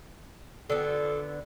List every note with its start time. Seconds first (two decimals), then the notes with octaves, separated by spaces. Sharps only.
0.70 D3 B3 A4